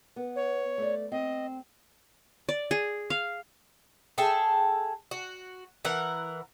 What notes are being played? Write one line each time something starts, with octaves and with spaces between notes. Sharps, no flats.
B3
C#5
A3 D5
C4 D#5
D5
G#4
F5
G#4 A4 E5 G5
F#4
E3 A#4 F#5